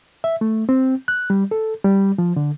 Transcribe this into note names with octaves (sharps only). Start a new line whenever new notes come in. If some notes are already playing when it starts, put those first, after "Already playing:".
E5
A3
C4
F#6
G3
A4
G3
F3
D3